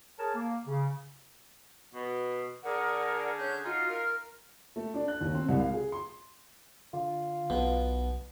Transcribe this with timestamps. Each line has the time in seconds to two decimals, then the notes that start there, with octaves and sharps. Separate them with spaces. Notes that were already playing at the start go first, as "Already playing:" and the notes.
0.19 G#4 A#4 C#5 A5
0.34 A#3
0.66 C#3
1.94 B2
2.64 D3 G#4 A#4 D5 F#5
3.37 C#4 F#6 G6
3.65 D#4 F4 F#4
3.87 A#4 F6
4.76 A3
4.94 D4
5.08 F#6
5.21 D#2
5.34 C4
5.48 C2
5.60 F5
5.74 G#4
5.92 C6
6.93 D3 F4
7.50 B1 B2